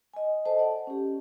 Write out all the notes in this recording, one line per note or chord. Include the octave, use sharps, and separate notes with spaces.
D#5 G#5
A4 C5 D#5 A5
D5 F#5
C#4 G4